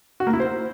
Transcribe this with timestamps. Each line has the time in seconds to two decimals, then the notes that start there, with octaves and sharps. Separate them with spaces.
0.20 F#4
0.27 A#3
0.33 E4
0.40 C5